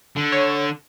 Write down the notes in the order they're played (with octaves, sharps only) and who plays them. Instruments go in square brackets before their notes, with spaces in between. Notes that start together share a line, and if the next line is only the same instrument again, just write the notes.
[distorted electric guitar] D3
[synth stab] C#5